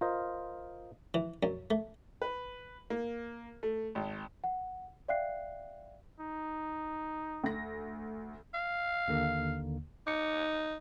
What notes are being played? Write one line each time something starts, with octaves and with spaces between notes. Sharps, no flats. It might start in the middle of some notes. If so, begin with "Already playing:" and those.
F4 A#4 C5 D#5
E3
F#2
A3
B4
A#3
A3
G#1
F#5
D5 E5 F5 G5 F#6 C7
D#4
D2 A#6
F5
D#2 D3 A#3
D#4 D6 C#7